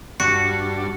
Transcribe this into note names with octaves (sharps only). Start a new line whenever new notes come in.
G2 D4 F#4 C#7